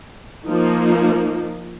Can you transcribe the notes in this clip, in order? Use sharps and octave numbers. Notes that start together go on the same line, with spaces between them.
F3 A#3 D#4